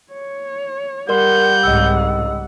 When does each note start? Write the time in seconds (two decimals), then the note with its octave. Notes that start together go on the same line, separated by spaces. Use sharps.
0.12 C#5
1.09 G3 A#4 D5 F#5 C6 G6
1.63 C2 G#2 C#3 D#5 E6